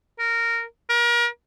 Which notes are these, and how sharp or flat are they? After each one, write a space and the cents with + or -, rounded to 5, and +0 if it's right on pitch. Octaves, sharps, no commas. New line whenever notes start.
A#4 -10
A#4 +35